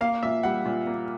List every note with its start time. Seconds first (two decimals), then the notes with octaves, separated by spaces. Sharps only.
0.01 A#3 F5
0.23 A#2 E5
0.43 G3 F#5
0.65 A#2
0.87 A#3